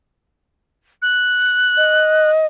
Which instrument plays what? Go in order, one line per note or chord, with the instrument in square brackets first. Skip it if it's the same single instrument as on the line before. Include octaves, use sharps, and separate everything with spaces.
[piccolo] F#6
[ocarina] D#5